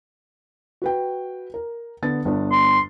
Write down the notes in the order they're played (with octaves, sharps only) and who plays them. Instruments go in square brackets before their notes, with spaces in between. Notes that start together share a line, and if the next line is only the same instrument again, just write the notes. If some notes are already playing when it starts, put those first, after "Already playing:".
[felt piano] F#4 B4 G5
A#4
D3 B3 A6
G1 B3 D4
[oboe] C6